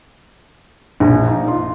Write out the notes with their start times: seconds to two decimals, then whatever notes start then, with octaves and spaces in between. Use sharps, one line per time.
1.00 A#1
1.26 D#4
1.47 F4